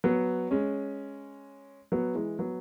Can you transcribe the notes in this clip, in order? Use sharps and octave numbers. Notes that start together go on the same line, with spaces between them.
F#3 B3
G#3 C#4
F#3 B3
E3 G#3
F#3 B3